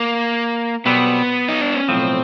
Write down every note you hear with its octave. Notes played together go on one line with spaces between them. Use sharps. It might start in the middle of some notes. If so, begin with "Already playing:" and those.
Already playing: A#3
B1 B2 G3 B3 C4
D#4
D4
C#4
B1 A2 F3 C4